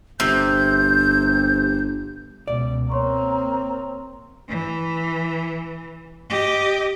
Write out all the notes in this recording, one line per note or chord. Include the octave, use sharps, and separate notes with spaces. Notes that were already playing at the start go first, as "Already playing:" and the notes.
G1 C3 G6
C#2 B2 D5
A#3 C4 C#5 A#5 C6 C#6
E3
G4 D#5